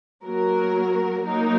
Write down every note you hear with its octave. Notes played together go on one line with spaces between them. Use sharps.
F#3 A#3 F#4 A#4
F#3 A#3 D#4 A#4